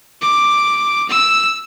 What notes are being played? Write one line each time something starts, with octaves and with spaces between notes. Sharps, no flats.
D6
E6